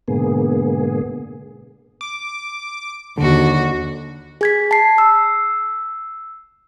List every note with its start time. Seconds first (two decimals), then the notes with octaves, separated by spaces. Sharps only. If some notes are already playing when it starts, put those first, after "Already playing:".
0.08 G#2 B2 D3 A#3 B3 G#4
2.01 D6
3.18 D#2 D3 F#4
4.41 G#4 G#6 B6
4.71 A5 C7
4.98 E6